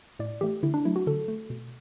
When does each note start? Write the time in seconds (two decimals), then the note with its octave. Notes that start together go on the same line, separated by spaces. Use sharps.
0.19 A2 D5
0.41 E3 A3 G4
0.63 D3 E4
0.74 D4
0.85 F#3 A3 E4
0.96 F#4
1.07 D3 A4
1.28 A3
1.50 B2